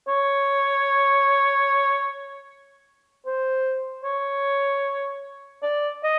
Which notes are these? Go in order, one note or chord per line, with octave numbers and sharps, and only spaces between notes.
C#5
C5
C#5
D5
D#5